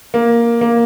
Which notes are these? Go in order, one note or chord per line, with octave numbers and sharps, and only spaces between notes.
A#3
A#3